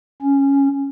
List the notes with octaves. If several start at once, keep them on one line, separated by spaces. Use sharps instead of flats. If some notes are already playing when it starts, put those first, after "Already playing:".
C#4